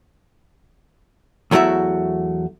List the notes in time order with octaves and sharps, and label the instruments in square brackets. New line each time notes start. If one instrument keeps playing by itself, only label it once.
[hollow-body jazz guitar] E2 F#3 A3 E4 F#4 E5